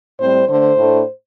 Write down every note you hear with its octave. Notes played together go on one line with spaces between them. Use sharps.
A2 G3 C4 C5
D3 A3 D4 C5
A2 A3 D4